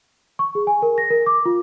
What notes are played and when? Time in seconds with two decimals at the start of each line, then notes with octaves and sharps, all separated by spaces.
0.39 C#6
0.55 G#4
0.67 G#5
0.82 A#4
0.98 A#6
1.10 A#4
1.26 D6
1.46 F4